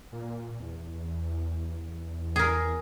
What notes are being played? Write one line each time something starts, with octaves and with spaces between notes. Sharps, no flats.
A#2
E2
G#4 A#4